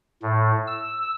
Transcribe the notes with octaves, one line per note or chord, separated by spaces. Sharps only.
A2
E6